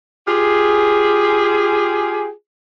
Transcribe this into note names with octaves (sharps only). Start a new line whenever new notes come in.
F4 G4 G#4